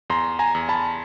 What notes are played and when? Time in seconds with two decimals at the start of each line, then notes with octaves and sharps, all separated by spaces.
0.10 E2 A#5 C6
0.39 G#5 A#5
0.55 E2
0.69 A5 B5